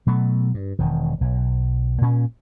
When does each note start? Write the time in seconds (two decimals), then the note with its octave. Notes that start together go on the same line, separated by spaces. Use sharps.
0.07 B2 F#3 A3
0.54 G2
0.79 E1 D#3
1.21 B1
2.01 A#2 C#4